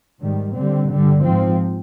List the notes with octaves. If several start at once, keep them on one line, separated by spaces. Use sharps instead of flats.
G#2 D#3 G3
D3 G3 C4
G2 D3 G3
G#2 F3 C4